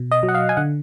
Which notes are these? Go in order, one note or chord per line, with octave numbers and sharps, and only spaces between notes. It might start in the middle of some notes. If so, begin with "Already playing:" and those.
Already playing: B2
D#5
F#3
F#5
F5
G#5
D3 F#5